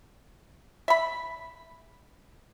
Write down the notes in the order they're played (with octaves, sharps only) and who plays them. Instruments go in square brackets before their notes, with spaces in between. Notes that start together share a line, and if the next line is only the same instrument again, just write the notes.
[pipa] E5 B5